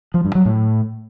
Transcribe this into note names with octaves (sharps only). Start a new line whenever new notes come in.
F3
G2
F#3
A2